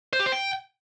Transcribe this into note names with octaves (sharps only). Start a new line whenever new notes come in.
C5
G4
C5
G5